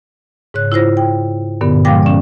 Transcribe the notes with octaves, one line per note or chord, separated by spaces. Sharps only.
G#2 C#3 C#5 F#6
E4 F4 C5 A#6
G5
G2 A#2 D3 B3
F3 G#3 F5 G5 D6 A#6
C#4 D5